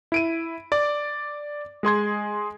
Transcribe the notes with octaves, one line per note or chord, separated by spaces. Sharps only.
E4 D7 D#7
D5 D6
G#3 G#4 C6 G#6